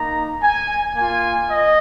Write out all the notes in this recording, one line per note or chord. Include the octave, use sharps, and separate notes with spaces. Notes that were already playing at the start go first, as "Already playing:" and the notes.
Already playing: A#3 D#4 A#5
G#5
A#3 F4 G#5
D#5